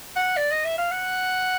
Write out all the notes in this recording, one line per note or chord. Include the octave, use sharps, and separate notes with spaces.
F#5
D5
D#5
E5
F5
F#5